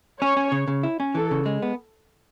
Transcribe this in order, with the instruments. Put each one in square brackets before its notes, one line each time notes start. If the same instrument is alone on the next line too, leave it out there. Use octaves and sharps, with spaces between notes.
[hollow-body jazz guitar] C#4 [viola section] C#5
[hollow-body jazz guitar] C#4
C#3
C#3
E4
C#4
[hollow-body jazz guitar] E3 [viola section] A4
[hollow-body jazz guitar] C#3
G#3
B3